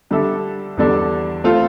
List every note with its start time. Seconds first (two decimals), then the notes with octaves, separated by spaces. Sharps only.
0.10 D3 G3 D4 A4 E5
0.77 E2 D3 G3 D4 A4
1.44 A3 C4 F4 A4